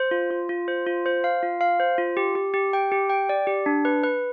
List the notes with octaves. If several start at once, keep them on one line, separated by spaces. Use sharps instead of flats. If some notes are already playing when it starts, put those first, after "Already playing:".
Already playing: C5
F4
F4
F4
C5
F4
C5
F5
F4
F5
C5
F4
G4
G4
G4
G5
G4
G5
D5
G4
D4
B4
B4